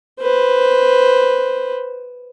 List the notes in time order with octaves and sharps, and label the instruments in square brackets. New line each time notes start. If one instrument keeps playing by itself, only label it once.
[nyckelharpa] B4 C5